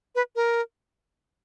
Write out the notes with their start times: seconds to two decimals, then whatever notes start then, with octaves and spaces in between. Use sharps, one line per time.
0.15 B4
0.36 A#4